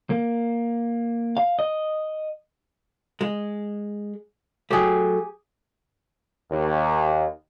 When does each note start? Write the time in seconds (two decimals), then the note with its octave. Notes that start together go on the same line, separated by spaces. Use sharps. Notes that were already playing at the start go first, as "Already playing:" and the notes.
0.10 A#3
1.37 F5
1.59 D#5
3.21 G#3
4.71 F#3 A3 G4 G#4
6.49 D#2